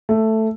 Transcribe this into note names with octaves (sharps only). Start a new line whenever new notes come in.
A3